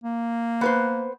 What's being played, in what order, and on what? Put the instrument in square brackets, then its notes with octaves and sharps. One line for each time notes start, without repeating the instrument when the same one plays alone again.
[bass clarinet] A#3
[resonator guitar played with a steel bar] B3 B4 C5